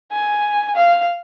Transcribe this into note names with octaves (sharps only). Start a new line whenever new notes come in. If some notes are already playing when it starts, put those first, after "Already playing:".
G#5
F5